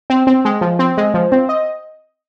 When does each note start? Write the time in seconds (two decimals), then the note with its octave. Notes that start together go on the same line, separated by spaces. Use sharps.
0.10 C4
0.27 C4
0.45 G#3
0.61 F3
0.79 C4
0.98 G#3
1.14 F3
1.32 C4
1.49 D#5